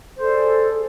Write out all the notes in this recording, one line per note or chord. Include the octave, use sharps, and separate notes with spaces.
G#4 A4 C5 D5